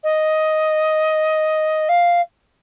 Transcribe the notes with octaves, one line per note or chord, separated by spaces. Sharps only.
D#5
F5